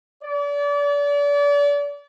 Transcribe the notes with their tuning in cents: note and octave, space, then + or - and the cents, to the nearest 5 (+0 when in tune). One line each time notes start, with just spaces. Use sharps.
D5 -35